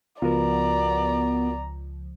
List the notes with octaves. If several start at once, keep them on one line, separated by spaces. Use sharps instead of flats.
C#2 F3 B3 F4 F#4 A#4 D5 A#5